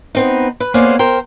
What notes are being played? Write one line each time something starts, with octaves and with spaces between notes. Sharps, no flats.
B3 C4 D#4
B4
A#3 B3 C#4 G#4 C5 D5
A#4 C5 G5